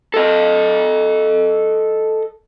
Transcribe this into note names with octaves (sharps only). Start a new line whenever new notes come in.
A4 D#5